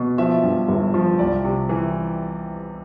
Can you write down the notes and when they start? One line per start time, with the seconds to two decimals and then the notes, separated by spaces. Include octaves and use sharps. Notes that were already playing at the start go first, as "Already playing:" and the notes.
Already playing: B2
0.18 F3 E5
0.43 G2
0.69 G1
0.94 F3
1.19 C2 D5
1.44 C3
1.69 E3